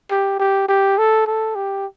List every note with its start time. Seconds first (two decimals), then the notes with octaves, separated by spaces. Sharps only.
0.11 G4
0.39 G4
0.68 G4
0.98 A4
1.27 A4
1.56 G4